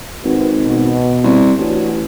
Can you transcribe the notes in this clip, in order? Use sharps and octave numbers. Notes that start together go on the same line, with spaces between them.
G#1 C4 F#4 B4
B2
C2
A1 C#4 D4 F#4